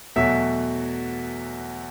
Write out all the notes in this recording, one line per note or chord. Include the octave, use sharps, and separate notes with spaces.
E2 B2 F#3 A3 E5